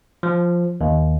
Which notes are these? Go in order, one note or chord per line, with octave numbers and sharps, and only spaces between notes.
F3
D#2